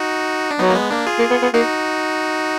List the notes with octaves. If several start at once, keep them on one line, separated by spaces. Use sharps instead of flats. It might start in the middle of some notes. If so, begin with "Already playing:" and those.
Already playing: D#4 F#4
D4
F#3 B3 D#4
A#3
G#3 B3
A#3 D4
F4 G#4
A#3
B3
B3
A#3 D#4 F#4